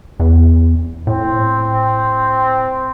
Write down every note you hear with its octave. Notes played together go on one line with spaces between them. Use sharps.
E2
A2 C4